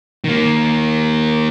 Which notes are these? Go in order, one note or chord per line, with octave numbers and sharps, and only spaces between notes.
D#3 A#3